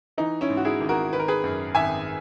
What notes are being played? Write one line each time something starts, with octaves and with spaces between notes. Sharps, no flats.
E3 D#4
C#4 E4
G#2
F#4
E4 G#4
G#1
F#4 A#4
D#3 B4
A#4
G#4 B4
F#2
G#1 E5 G#5